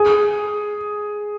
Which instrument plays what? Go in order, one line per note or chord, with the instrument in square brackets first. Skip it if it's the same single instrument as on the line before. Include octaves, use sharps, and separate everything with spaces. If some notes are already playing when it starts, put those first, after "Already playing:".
Already playing: [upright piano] G#4